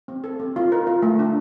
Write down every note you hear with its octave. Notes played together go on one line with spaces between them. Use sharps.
C4
A4
C4
F4
A#4
F4
A3
D4